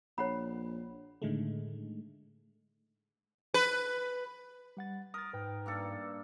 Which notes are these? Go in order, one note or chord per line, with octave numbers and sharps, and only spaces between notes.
A#1 C#5 F#5 B5
A2 D3 D#3 G#3 A3
B4
G3 F#5 A6
A#4 D#6 A6
G#2 B4 G5
G2 A#3 A4